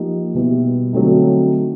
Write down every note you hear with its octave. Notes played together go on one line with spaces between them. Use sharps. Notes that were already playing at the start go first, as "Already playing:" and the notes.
Already playing: F3 A#3 D#4 G4
B2 G3 B3 E4 G4
D3 F#3 A3 C4 D#4